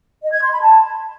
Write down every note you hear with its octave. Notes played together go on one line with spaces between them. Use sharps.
D#5
G#6
C6
B5
A5